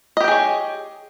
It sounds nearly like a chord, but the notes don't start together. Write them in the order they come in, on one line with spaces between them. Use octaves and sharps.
D#5 G4 G5 G#4 C#5